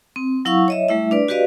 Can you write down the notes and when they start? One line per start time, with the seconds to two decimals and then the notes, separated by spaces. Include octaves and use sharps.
0.16 C4
0.45 F#3 E4 F5 F#5 C#6 E6
0.68 C#5 D#5 E5
0.89 G3 A3 E4 E5
1.11 D4 B4 D5
1.28 F#4 G4 B4 D5 D#5 F5